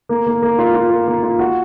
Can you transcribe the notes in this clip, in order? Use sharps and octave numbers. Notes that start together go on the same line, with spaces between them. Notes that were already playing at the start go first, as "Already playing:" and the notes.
A#3
A#3
A#3
F4
F4
A#3
A#3
F4
F#4